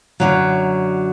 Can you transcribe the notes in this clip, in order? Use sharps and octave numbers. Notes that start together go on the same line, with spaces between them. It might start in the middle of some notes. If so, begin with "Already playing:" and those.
F#2 D3 F#3